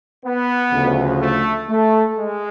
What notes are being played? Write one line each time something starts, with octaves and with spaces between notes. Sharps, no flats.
B3
D2 C#3 F3
A3
A3
G#3